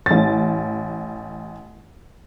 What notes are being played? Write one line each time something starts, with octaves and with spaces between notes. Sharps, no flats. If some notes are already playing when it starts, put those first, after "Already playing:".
A1 A6